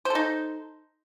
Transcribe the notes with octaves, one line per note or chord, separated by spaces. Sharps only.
D#4 A4 C5